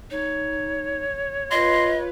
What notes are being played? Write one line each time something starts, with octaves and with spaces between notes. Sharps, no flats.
D#4 C#5
F4 B4 D#5 C6